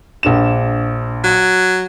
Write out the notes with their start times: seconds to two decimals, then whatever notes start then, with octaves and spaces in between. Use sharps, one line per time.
0.23 A#1 D4 E7
1.24 F#3